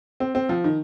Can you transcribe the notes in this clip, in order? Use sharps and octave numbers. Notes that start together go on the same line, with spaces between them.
C4
C4
F3
D#3